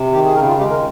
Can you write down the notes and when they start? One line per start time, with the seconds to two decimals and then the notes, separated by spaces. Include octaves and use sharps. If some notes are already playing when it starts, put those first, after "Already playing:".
Already playing: C3
0.12 D#3 G4
0.25 G#4
0.35 C#3 A#4
0.47 F4
0.59 G#3 G4
0.70 A#4